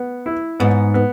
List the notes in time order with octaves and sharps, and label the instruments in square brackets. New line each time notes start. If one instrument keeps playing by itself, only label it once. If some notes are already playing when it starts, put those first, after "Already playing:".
Already playing: [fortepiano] B3
E4
[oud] G#2 [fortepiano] B3
[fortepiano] B3